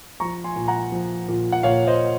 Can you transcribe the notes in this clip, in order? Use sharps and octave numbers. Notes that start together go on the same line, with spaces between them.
F3 A#5 C#6
G#5 C6
A#2
F#5 A#5
F3
A#2
F#5
A#2 C#5 F5
C5 D#5